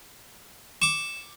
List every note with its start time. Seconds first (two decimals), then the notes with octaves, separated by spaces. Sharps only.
0.82 C#6 D6 E7